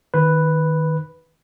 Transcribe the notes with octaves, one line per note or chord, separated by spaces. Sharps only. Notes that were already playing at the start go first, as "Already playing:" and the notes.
D#3 B4